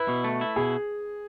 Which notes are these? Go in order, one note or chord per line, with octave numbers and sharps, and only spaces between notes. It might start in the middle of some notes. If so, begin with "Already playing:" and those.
Already playing: E4 B4
B2
A3
E4
B2 G#4